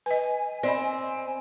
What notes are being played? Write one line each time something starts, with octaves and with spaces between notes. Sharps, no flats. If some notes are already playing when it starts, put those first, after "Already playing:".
B4 D#5 G#5
C4 D5 D#5 B5